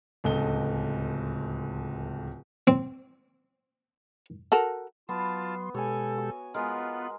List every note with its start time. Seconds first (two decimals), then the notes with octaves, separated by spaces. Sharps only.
0.24 D1 C#2 A4 D#5 G7
2.67 C4
4.52 F#4 A4 A#4
5.09 F#3 B3 F4 A5 C6
5.74 B2 G#3 G4 A4 C#5 G#5
6.18 F#4
6.54 G#3 B3 F4 G#4 A#4 F#5